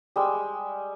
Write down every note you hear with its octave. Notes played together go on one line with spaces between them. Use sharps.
G3 G#3 E6